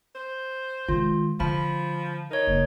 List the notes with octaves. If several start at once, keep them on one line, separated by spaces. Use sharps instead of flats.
C5
D#3 G#3 F4
D3 F3 B5
D#4 A#4 C#5
F#1